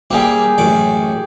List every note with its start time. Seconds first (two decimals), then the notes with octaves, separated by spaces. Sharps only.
0.11 G3 A#3 C4 G4 G#4
0.58 A1 F#2 D5